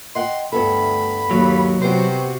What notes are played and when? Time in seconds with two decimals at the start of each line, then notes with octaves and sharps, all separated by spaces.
0.15 D#5 F#5 G5 C6
0.53 D2 G2 B3 A4 B5
1.31 D#2 F#3
1.82 C3 B3 F#4 G4 C5